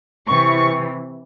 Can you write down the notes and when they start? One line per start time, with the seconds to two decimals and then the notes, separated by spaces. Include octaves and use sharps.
0.28 C3 E3 C#6